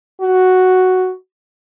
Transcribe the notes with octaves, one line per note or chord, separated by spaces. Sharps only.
F#4